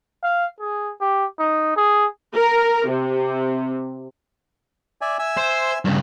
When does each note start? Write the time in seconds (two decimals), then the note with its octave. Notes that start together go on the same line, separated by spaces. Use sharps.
0.23 F5
0.60 G#4
1.01 G4
1.39 D#4
1.77 G#4
2.35 A#4
2.89 C3
5.01 D5 E5 G#5
5.19 E5 G#5 E6
5.37 C5
5.85 G2 C#3